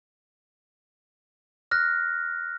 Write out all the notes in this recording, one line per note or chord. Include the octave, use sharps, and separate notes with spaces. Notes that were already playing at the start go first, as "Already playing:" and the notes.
F6 F#6 A#6